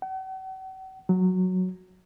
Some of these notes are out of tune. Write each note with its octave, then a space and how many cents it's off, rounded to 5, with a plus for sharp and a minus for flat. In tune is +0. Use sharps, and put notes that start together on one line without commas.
F#5 +45
F#3 -5